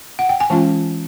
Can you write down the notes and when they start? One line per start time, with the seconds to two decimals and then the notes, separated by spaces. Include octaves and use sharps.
0.19 F#5
0.29 G5
0.40 G#5
0.50 E3 G#3 C#4 F4 A5